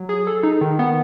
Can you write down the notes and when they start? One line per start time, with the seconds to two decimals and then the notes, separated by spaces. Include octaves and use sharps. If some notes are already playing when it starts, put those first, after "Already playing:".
Already playing: F#3
0.09 G#4
0.27 A4
0.43 D#4
0.61 D#3
0.79 B3